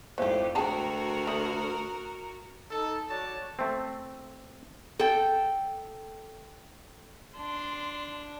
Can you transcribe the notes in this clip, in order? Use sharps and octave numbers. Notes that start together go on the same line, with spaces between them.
F2 G#2 E3 A3 G4 C5 D5 F5
D2 F#4 G#4 A#4 G5 A5 A#5
A3 D#6 F#7
D#4 A4
F#4 C#5 D5 A5
A3 C4
A4 G5
D4 C6